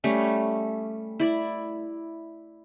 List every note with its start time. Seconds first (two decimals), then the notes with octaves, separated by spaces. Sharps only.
0.04 G3 A3 C#4
1.20 E4 D5